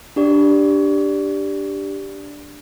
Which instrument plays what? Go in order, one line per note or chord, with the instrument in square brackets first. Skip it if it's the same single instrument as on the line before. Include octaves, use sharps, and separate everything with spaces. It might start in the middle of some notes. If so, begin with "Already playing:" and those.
[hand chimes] D4 G4 D5